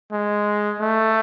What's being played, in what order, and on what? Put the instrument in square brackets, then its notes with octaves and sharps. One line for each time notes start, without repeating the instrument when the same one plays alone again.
[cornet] G#3
A3